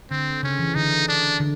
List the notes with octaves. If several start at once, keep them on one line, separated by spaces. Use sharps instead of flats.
D3 C4
C#3 C#4
E3
D3 D#4
D4
D3